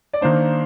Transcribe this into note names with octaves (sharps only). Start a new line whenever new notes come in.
D5
D#3 A#3 D4 C5